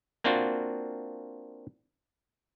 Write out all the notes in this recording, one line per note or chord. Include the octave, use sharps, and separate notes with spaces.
A#3 C4 D4 F4 F#4